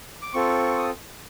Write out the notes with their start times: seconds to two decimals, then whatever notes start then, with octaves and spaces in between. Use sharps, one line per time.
0.22 D6
0.33 C4 F4 A4 C#6
0.78 D#6